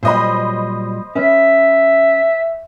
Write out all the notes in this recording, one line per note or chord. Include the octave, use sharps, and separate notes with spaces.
A#2 F#3 G3 C5 D#5 B5
C#4 B4 E5